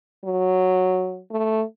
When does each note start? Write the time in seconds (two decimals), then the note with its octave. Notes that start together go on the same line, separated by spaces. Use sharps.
0.24 F#3
1.31 A3